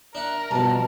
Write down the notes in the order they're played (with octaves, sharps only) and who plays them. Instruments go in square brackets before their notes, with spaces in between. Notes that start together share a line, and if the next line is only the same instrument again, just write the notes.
[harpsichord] D4 E5 F#5 [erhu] A#4
[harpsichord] G2 F3 [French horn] B2 [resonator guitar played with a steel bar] A5